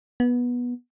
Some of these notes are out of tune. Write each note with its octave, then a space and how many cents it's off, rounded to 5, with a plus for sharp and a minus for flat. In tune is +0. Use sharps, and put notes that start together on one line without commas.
B3 -15